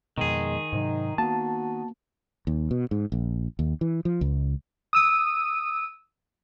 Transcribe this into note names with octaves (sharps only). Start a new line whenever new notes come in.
F2 B2 D#3 G#3 G#4
G#2 C3 F#3 D#4
A#3 B3 F#4 A5
D#2
B2
G#2
A#1
D#2
E3
F3
C#2
D#6 E6 D#7